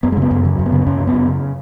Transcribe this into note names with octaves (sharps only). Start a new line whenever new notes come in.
F#2 B3
G#3
C#3 B3
F#2
C#3 F#3
F#2
B3
C#3
F#2 C#4
C#3
B3
F#2
C#3